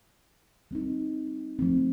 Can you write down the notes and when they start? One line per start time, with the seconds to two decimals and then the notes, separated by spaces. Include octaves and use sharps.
0.71 G3 C4 D#4
1.59 F3 A3 C4